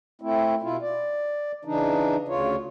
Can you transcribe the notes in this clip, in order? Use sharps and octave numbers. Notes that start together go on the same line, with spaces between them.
A3 C4 E4
B2 E4 F4
D5
C#3 E3 D4 D#4
D2 C#3 F4 C#5